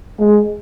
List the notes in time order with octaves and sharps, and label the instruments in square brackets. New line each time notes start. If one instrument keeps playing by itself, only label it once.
[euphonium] G#3